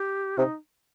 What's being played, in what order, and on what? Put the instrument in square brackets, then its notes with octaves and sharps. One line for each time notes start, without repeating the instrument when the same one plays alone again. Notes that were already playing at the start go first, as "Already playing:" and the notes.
Already playing: [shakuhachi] G4
[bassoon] C3 [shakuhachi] D#4